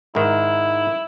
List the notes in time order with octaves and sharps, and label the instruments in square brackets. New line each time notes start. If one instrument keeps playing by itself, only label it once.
[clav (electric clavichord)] G#2 D#3 [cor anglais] E4